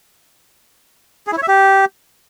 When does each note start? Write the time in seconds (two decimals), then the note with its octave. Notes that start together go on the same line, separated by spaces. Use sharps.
1.27 G#4
1.32 E4
1.37 C#5
1.43 E5
1.48 G4